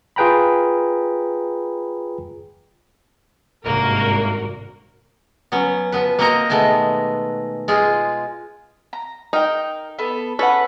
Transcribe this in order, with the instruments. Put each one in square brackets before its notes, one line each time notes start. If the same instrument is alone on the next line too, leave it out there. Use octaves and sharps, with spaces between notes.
[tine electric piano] F4 G#4 B4 G5 A#5 B5
[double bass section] G#1 G2 C3 [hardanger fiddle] A#3 [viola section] F#4 A#4
[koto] F#3 B3 C#4
F3 B3 B4
A#3 C4 F#4 D#5 A#5
B2 D#3 G#3 A3 B3
G#3 F4 G#4
[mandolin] A#5
[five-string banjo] D#4 [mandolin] A#4 G5
[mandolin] B3 A4
[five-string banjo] C#4 A4 [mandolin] B4 F#5